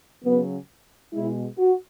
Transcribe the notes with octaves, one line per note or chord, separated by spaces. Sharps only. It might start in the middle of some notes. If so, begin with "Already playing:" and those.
C#3 F#3 B3
B2 G#3 E4
F#4